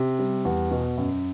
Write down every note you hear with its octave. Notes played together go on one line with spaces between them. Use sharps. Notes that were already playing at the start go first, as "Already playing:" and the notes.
Already playing: C3
G3
E2
B2
F#2